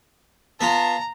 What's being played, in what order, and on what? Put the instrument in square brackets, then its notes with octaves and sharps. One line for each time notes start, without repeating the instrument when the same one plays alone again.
[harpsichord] B3 F4 [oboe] A5 [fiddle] A#5